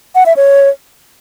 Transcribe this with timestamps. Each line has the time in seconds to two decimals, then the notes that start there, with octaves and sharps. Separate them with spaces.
0.15 F#5
0.26 E5
0.36 C#5